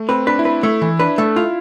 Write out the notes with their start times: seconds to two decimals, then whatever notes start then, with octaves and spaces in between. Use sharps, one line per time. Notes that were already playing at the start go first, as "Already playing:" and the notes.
Already playing: A3
0.09 C4 B4
0.27 D4 B4
0.39 E4
0.45 B4
0.63 A3 E4
0.82 E3
1.00 D4 B4
1.18 A3
1.36 E4 F4